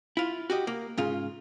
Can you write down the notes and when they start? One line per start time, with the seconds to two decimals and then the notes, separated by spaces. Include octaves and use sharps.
0.17 E4 F4
0.50 F#4 G4 D#5
0.67 A#3
0.98 G#2 C#3 F4